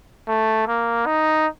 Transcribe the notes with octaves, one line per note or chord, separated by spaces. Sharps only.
A3
A#3
D#4